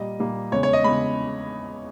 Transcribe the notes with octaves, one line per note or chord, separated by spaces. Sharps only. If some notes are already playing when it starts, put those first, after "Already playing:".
Already playing: A#2 G3 A#3 D#5
A#2 G3 A#3
E2 C#3 G#3 C#5
C#5
D#5
E2 C#3 G#3 B5